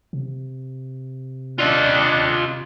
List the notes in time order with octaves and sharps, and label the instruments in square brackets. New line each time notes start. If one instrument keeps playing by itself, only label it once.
[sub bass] C3
[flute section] D4 D5 F#6 [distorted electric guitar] F4 D#5